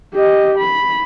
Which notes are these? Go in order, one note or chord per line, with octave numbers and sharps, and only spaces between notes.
G4 D#5
B5